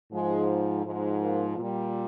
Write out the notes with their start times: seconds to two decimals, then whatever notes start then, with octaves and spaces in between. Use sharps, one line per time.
0.12 G#2 F3 G#3
0.84 G#2 F3
1.21 A#3
1.57 A#2 G3